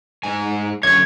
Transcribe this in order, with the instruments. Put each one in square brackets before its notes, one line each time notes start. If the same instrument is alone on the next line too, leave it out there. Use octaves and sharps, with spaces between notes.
[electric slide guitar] G#2 G#5
[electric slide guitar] F#2 D3 C#5 [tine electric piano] G#6